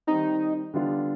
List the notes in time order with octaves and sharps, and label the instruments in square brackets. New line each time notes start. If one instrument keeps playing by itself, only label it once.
[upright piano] D#3 G3 C4 [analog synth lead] D#4
[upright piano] D3 G3 B3 D4 F4